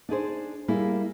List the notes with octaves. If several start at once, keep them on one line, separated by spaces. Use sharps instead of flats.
D4 D#4 G#4 C5
G3 A#3 E4 G#4